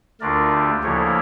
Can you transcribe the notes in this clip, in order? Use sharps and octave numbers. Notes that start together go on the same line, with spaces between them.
D2 D3 A3 D4 F4 A#4 D5
G4
D2 C#3 F3 A#3 E4 A4 C#5